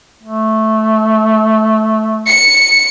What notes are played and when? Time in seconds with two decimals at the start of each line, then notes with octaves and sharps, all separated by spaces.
0.23 A3
2.28 C#7